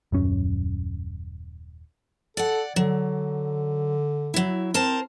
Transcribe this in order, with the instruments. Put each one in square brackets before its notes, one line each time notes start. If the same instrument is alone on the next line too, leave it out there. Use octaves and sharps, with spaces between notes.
[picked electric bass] D#1 F#2 C#4
[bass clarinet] A4 [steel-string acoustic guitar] D5 F#5
[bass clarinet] D3 [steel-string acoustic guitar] F#3
[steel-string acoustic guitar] F#3 E4
[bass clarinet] C4 [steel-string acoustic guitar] A#4 C5 A5